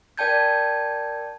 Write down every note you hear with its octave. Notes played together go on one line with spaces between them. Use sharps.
A#4 D5 G5 A5 G6 G#6